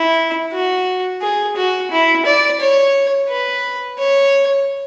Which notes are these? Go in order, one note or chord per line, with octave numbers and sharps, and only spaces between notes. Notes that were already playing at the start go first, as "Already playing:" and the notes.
Already playing: E4
F#4
G#4
F#4
E4
D5
C#5
B4
C#5